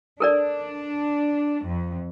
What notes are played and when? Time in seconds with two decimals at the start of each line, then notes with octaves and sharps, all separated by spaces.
0.20 D4 A4 A#4 D5
1.67 F2